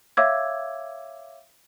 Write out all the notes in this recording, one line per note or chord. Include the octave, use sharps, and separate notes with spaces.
C#5 E5 F5 D6 E6 G#6